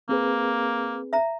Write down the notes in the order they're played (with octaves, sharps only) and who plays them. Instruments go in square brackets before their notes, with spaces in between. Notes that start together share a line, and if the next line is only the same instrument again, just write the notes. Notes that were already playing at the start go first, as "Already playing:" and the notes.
[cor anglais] A#3 [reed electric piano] C4 G#4 B4
[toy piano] E5 A#5